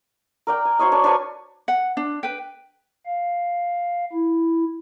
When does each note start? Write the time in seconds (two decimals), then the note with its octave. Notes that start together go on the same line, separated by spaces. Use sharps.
0.47 A#4 D5 G5
0.65 G#5
0.79 F#4 C5 C#5 D#5
0.92 D4 C#5 D5
1.04 D4 B4 C5 G#5
1.68 F#5
1.97 D4
2.23 B4 G5
3.06 F5
4.13 E4